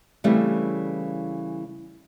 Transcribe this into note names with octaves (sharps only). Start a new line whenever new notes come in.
C#3 E3 G3 A3 C4